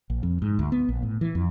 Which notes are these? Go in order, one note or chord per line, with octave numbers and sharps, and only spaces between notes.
A#1
F2
G#2
D2
B3
A#1
A2
E3
F2